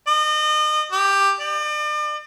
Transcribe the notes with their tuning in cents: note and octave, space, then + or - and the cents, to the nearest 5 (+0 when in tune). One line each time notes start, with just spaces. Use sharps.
D#5 -35
G4 +10
D5 +40